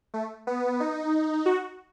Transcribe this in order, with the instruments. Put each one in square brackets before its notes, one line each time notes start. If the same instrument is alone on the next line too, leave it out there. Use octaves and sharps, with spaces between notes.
[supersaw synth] A3
B3
D#4
F#4